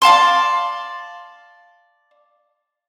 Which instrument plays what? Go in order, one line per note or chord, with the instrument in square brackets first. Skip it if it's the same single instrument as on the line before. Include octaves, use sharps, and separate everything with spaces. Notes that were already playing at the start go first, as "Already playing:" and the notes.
[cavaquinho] D5 F5 A5 C6